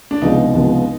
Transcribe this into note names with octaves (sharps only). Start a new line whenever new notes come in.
D4
C#2 C3 F3 G#3 B3 D#4
C#2 C3 F3 G#3 B3